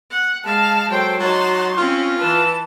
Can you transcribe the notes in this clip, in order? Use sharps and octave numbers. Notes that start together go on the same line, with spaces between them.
F#5
G#3 F5 A5
F#3 A4 C5 G5
F#3 D#4 F#4 A5 C6
C4 C#4 F4
E3 B4 A5